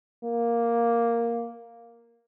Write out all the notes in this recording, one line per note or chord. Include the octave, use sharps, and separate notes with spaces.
A#3